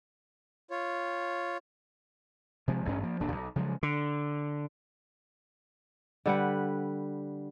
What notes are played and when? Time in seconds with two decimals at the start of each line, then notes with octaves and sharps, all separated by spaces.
0.71 F4 C#5
2.68 C3 F3 G#3
2.85 A1 G2 C#4
3.03 F3 A#3
3.20 D#1 A#2 D4
3.32 B1
3.56 C#3 F3 F#3 G#3
3.83 D3
6.26 D3 G3 B4 F#5